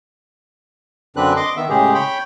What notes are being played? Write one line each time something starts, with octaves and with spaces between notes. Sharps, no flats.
F#2 D3 C4 D4 B4 F#6
D#5 C6 D6
D#3 B3 E5
A2 C#3 G#3 G4 G#4
C#5 G5 B5